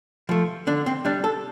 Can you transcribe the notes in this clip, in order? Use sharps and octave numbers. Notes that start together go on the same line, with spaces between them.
F3 A3
D3 D4
C4
G3 D4
A4